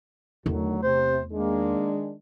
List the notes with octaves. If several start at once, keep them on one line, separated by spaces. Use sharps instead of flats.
E2 D3 D#3 F#3 A3 F#4
C3 C5
D#3 G#3 A#3 D4